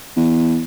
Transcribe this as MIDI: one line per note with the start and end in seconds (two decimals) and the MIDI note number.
0.16 0.64 40